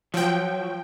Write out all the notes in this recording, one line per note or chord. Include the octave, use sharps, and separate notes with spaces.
F3 F#3 G5